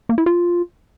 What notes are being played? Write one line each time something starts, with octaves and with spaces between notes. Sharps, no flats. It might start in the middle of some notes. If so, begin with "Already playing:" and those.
A#3
E4
F4